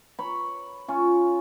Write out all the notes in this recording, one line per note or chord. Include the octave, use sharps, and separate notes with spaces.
C#5 B5
C#4 F4